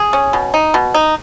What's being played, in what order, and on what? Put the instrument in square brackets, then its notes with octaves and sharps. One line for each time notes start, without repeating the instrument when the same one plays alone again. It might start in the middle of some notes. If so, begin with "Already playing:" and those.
Already playing: [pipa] G#4
C#4
B2
D#4
B2
D#4